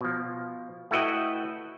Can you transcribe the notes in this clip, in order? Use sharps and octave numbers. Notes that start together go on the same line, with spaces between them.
B2 F3
A3 E4 F#4 B4 D#5 G5